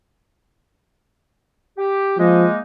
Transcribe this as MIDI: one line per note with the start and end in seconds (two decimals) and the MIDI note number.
1.78 2.16 67
2.19 2.48 53
2.19 2.59 56
2.19 2.59 58
2.19 2.59 63